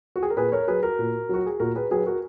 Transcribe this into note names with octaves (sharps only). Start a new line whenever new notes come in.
F#4
G#4
A#4
A#2 G#4 B4
A#4 C#5
F#3 G#4 B4
F#4 A#4
A#2
F#3 F#4
G#4
A#2 F#4 A#4
G#4 B4
F#3 G#4 B4
F#4 A#4